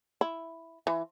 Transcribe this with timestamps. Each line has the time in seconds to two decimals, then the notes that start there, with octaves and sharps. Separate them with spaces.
0.21 E4
0.87 E3